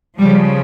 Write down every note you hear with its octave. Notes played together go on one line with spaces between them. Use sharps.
C#3 F3 G3